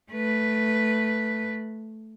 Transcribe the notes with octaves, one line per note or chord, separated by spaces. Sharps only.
A3 B4